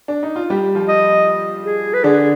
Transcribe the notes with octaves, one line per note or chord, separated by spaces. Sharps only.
D4
D#4
F4
G3 G4
F3 F4
D#5
G#4
B4
D3 D4 G#4